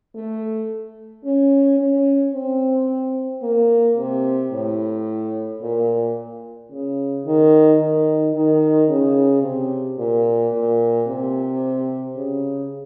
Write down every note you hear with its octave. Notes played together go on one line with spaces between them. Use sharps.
A3
C#4
C#4
C4
A#3
C3
A2
A#2
C#3
D#3
D#3
D#3
C#3
C3
A#2
A#2
C3
C#3